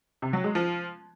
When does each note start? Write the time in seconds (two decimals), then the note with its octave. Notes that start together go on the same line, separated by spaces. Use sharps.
0.22 C3
0.33 F#3
0.44 G#3
0.55 F3